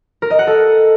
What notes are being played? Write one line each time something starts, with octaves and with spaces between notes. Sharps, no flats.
A#4
D#5
F#5
A4